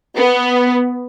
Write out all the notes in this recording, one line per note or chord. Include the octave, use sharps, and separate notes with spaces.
B3